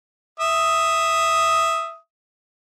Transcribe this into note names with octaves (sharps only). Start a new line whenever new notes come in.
E5 D#6